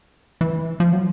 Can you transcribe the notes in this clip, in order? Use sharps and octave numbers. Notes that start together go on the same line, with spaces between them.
E3
F3
F#3